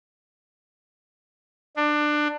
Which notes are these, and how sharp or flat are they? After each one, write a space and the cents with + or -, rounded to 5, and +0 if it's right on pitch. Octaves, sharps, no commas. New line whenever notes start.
D4 +20